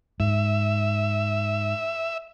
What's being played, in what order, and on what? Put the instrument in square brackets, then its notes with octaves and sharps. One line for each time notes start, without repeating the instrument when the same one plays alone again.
[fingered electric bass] G#2 [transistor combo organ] E5